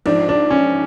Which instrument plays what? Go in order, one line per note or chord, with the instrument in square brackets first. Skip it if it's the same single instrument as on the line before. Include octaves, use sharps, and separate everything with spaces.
[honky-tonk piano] A#1 G#2 F3 [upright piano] D4
[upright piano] D4
C#4